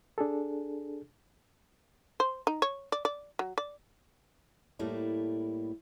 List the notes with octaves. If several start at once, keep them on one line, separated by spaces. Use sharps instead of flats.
D4 G#4 A4
C5
D#4
C#5
D5
D5
F#3
D5
A2 G3 A3 A#3 E4